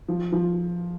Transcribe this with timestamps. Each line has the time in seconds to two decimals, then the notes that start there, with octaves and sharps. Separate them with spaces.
0.09 F3
0.32 F3